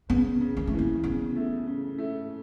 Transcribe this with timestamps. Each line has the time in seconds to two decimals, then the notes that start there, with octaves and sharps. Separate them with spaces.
0.10 C#3 B3
0.41 C#3
0.57 A#3
0.67 A3
0.73 E3
0.79 A#3
1.04 C#3 B3
1.36 A3
1.67 C#3
1.98 A3